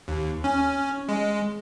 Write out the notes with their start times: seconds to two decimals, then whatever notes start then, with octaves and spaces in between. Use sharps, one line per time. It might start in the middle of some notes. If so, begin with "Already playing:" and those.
0.08 D#2
0.44 C#4
1.09 G#3